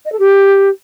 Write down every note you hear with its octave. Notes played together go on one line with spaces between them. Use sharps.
D#5
A4
G4